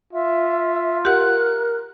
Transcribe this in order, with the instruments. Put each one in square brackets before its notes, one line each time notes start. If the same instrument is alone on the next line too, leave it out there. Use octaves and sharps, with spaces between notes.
[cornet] F4 [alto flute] E5
[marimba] G4 F#5 [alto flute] A#4 [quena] F#6